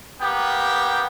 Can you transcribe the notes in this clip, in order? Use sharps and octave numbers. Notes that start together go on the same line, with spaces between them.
A#3 B3 G4 G5